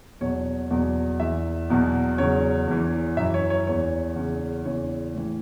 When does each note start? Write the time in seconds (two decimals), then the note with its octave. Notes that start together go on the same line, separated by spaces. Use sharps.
0.21 E2 B2 F#3 C#5
0.71 E2 B2 F#3
1.20 E2 E3 E5
1.70 E2 B2 F#3
2.18 E2 C#3 F#3 C#5
2.68 E2 E3
3.17 F#2 E3 E5
3.34 C#5
3.50 C#5
3.67 E2 E3 C#5
4.16 E2 C#3 E3
4.65 E2 C#3 E3 C#5
5.15 A2 E3